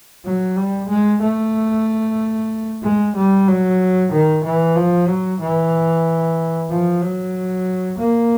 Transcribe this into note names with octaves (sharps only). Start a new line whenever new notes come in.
F#3
G3
G#3
A3
G#3
G3
F#3
D#3
E3
F3
F#3
E3
F3
F#3
A#3